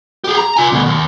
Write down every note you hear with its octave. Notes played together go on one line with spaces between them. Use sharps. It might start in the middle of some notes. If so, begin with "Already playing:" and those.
G4 G#4
A#5
F4 G#5
D2 B2
D#2